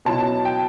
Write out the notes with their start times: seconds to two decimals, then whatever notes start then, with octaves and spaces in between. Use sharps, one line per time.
0.05 B2 F#3 C#4 E4 A5
0.45 G5